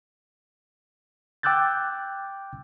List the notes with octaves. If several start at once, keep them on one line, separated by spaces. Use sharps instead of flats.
G5 D6 E6 F#6 G6 A6